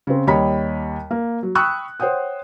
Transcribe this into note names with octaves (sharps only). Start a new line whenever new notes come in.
C#3 C4
D#2 G3 C#5 D#5 B5 B6
A#3
F#3
G5 B5 C#6 D#6 E6 F#6
C5 C#5 F#5 G5 D#6